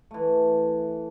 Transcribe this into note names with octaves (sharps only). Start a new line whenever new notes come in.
E3 A3